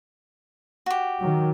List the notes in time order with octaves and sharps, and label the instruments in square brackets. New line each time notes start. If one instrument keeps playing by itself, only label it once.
[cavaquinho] F#4 G4
[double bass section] D#3 F#3